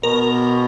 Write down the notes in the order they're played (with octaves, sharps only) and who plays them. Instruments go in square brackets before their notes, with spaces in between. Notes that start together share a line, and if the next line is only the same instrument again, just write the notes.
[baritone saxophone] B2 [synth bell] A#4